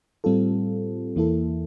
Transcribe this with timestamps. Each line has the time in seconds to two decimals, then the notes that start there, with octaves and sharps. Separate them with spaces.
0.24 A2 G3 C4 F4 A4
1.16 E2 E3 A#3 E4 A4